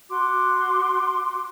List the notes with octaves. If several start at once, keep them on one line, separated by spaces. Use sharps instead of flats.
F#4 C6 D6